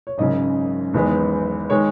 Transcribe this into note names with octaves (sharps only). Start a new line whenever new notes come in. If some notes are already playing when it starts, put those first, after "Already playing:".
C#5
G#1 F#2 C#3 D#5
F#1 E2 D#3 G#3 B3
D#3 G#3 C#5